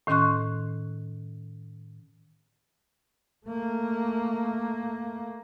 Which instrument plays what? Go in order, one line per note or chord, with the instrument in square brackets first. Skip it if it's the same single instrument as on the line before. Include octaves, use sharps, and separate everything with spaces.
[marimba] A2 D#3 C#4 C6 C#6 F#6
[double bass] A3 A#3